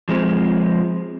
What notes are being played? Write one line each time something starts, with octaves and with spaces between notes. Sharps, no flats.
F3 G#3 C4